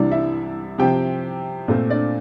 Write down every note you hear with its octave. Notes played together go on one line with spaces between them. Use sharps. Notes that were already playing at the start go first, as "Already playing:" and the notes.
Already playing: C2 C3 E3 G3 D4 D5
E4 E5
C3 F3 C4 G4 G5
A#2 A3 C4
D4 D5